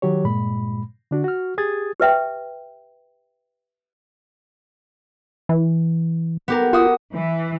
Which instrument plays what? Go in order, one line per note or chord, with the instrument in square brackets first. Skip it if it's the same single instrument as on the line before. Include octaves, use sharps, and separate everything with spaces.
[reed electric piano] D#3 F#3 G4 C#5
G2 A#2 G#3 B5
D3 D4 F#4
F#4 F6
G4 G#4 D#6 G#6 A6
[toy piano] G4 B4 E5 G5
[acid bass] E3
[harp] B3 G4 A#4
[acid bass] F4 [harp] F#4 D#6
[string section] E3